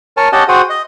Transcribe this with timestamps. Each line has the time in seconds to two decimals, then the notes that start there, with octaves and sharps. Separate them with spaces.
0.17 A#4 C#5 G#5 A5
0.32 C#4 G4 D#5 F#5 A5
0.48 F#4 G#4 C5 F#5 G5 D#6
0.70 D#5